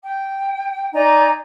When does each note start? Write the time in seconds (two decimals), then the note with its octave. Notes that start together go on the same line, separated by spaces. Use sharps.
0.02 G5
0.93 D#4 D5 G#5 A#5